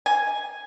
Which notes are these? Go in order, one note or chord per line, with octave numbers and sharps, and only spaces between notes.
G#5